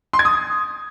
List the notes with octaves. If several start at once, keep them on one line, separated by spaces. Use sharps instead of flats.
C6
G#6
D#6